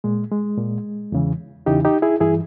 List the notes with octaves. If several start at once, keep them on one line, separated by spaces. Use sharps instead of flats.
A#2 G#3
G#3
A#2
E2 C#3 E3
E2 C#3 E3 D#4 G4
D#4 G4
E4 G#4
G2 E3 E4 G#4